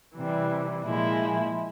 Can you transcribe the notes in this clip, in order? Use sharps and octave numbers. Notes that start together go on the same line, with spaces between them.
C3 E3 G3
A#2 F3 G#3 E4